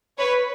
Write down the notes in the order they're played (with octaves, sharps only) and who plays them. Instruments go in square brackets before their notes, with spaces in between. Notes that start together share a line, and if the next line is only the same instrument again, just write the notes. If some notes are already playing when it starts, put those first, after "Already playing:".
[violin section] B4 C#5